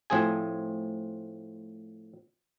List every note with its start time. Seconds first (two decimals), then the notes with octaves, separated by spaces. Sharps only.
0.10 A2 F3 C4 G#4 G#5